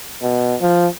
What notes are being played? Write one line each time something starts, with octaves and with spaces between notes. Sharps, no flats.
B2
F3